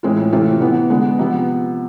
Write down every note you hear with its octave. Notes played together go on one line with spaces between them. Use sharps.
A2 E3 G#3 C4 F4
C3 E3 A3 C4 F4
C3 E3 B3
D3 G#3 B3
C3 F3 B3